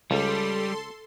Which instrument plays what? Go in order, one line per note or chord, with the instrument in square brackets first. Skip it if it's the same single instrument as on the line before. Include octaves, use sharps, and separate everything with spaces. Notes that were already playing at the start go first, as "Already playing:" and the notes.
[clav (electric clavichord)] C#2 [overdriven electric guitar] G3 [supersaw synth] A4 C6